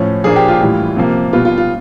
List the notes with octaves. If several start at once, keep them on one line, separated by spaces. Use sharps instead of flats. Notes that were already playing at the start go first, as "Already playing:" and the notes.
Already playing: A2 F3 C#4
A#2 F3 A#3 D4 G#4
G4
F4
A2 E3 G3
C3 F3 A#3
B2 G3 B3 F4
F4
F4